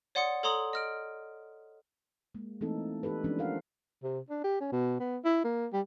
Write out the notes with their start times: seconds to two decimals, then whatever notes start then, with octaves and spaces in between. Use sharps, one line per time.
0.15 C#5 D5 F#5 C6 D#6 C#7
0.43 A4 C#5 A#5 C6 D#6 F#7
0.73 D#5 F6 D7
2.35 G#3 A#3
2.61 E3 A3 A#3 C4 D#4 A4
3.03 E3 D#4 G4 A4 B4
3.24 E3 F3 G#3 A#3 C#4 D4
3.39 F4 A#4 F5 F#5
4.03 C3
4.30 D4
4.44 G4
4.61 C#4
4.72 B2
5.00 B3
5.25 E4
5.44 A#3
5.73 G3